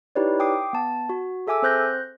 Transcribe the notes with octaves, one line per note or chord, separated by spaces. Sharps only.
D#4 E4 G4 B4 C#5 D5
G5 D6 D#6 C7
B3 A5
F#4
G#4 A4 E5 G#5 D6 E6
C4 C5 F#6 G6 A#6